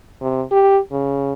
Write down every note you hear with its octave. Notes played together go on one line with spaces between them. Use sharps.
C3
G4
C#3